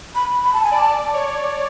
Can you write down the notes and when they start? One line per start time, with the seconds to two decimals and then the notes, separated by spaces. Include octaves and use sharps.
0.15 B5
0.44 B5
0.53 A5
0.63 G#5
0.71 D5 A5
1.14 C#5